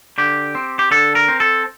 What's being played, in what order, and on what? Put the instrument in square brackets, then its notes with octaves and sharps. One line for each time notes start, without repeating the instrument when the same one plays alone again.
[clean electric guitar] D3 G4
C4
G4
D3 A4
A#4
C4
A4